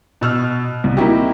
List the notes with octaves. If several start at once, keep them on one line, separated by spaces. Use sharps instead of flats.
B2 E6 F6
C2
A#3 C4 D#4 E4 F#4 G4